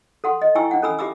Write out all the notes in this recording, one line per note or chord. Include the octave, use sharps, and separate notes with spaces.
A4 F#5 C6
D#5
E4 G5 G#5 C#6 E6
D4 F#5
C#4 A4 G#5 B5 E6
G4 E5 B5 D6 E6